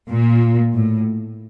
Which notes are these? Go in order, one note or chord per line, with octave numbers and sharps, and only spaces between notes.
A#2
A2